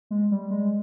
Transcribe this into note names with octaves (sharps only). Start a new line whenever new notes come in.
G#3
G3
G#3